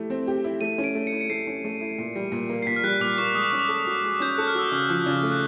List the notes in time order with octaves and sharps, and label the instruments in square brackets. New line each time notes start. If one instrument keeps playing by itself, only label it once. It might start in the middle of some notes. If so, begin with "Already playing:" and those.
Already playing: [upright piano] A3 E4 G4
C4
G4
E4
[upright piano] A3 [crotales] D#7
[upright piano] C#4
[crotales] D7
[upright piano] A3
[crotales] C#7
[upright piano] E4
[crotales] C#7
[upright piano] A3 [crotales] C7
[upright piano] C#4
A3
E4
A#2
G3
A#2
A#3
[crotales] C7
[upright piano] A#2 [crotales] B6
[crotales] F6
[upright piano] G3 [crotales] F#6
[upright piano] A#2 [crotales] D6
[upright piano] A#3 [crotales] C#6
[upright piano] G#3 [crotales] D#6
[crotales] D6
[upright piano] C#4 [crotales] C#6
[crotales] D6
[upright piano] A4
F#4
G#3
[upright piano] C#4 [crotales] G6
[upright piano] A4 [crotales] F#6
[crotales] F6
[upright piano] F#4 [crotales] E6
[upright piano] C#3 [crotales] D#6
[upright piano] F3
C#3
A3
[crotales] F#6